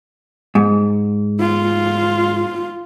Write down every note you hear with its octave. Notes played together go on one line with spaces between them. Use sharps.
G#2
F4